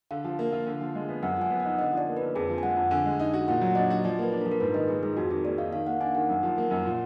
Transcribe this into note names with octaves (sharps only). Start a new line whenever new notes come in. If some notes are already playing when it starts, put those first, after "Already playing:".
D3 F5
F3
A#3
F4
D3
F3
G#3
B3
F#2 F#5
F3 G#5
B3
D#4 F#5
D3 D#5
F3
D5
A#3
D3 B4
F2 G#4
F3
G#5
G#3 F#5
F2
D3 G#5
G#3
D#4
F#4
A#2 F#5
F#3
D4 D#5
F#4
F3 D5
A#3 B4
D4
A#4
F3
A#4
G#2 B4
D#3 D#5
G#3 G#4
G#2 G#4
F2 F#4
D#3 G#4
A#3 D5
D#4 F5
D#3 F5
A#3 F#5
D4 G#5
D#3 F#5
F#2 F#5
F3
A#3
F#2
A#2